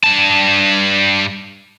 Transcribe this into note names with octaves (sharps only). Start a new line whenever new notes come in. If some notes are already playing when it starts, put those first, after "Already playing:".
G2 A5